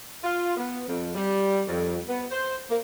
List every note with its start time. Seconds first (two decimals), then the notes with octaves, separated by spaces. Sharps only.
0.24 F4
0.57 B3
0.89 F2
1.15 G3
1.67 F2
2.08 B3
2.30 C5
2.70 A#3